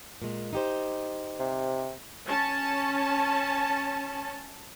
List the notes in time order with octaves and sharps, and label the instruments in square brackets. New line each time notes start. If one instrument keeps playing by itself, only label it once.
[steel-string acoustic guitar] A#2 G#3
D#4 G4 C5
[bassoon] C3
[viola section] C#4 A5